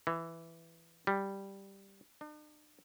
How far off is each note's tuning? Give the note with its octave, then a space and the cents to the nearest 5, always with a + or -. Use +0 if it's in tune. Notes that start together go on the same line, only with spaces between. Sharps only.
E3 +5
G3 +0
D4 +45